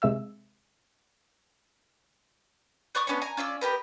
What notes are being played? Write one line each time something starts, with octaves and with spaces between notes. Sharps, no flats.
C3 G#3 E5 E6
B4 D5 C#6 D#6
B3 C#4 D4 C#5
G#5 A#5
C#4 F4 D5 E6
B3 G4 A#4 B4